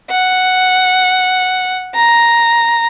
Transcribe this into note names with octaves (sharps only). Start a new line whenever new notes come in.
F#5
A#5